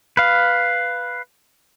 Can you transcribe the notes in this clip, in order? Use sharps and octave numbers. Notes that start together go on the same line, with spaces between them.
B4 F5